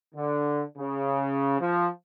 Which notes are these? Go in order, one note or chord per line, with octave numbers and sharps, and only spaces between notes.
D3
C#3
F3